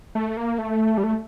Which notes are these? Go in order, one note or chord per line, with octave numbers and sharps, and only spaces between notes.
A3
A#3
A3
G3
A3